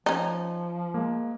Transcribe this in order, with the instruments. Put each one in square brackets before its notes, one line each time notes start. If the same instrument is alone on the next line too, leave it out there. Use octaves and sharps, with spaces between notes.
[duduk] F3 [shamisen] C#4 D#4
[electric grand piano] G#3 A#3